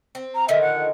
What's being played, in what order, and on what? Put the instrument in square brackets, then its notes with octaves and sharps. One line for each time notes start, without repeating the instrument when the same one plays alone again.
[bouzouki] C4
[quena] A#5
[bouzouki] D3 D#3 F3 [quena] E5
[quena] F#5